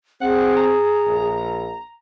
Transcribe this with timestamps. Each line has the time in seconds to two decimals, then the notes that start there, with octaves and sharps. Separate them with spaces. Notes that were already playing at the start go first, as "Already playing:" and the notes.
0.21 C4 G#4 F#5
0.56 A#5
1.06 A#1